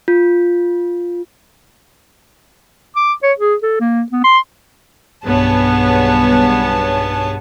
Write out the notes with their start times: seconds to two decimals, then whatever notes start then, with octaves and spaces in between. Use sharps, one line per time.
0.08 F4
2.96 D6
3.23 C#5
3.39 G#4
3.63 A4
3.80 A#3
4.12 B3
4.24 C6
5.26 B1 G2 B3 G#4 C#5 A5